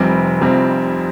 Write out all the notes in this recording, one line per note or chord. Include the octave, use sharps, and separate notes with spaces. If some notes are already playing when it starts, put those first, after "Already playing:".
Already playing: F1 F2 C3 G3 C4
F1 F2 C3 G3 C4